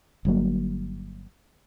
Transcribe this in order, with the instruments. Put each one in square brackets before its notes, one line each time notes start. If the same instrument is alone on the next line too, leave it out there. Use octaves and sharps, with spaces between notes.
[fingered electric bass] G1 G2 F#3 A#3